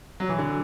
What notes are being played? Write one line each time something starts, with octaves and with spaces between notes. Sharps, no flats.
F#3
E3
D3